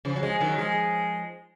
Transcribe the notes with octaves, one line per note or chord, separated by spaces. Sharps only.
C#3 F3
F#3
F3 G#3
D#3 F#3
F3 G#3